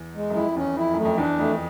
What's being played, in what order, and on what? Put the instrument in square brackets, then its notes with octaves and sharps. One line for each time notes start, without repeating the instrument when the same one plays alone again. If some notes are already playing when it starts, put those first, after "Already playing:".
Already playing: [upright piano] E2
[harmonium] G#3
[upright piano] F#2
[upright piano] F2 [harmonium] E4
[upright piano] E2 [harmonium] C#4
[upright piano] F2 [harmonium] E4
[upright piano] F#2 [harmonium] A3
[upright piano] F2
[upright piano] E2 [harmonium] D4
[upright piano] F2 [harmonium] A3